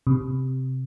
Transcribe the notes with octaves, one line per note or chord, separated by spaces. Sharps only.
C3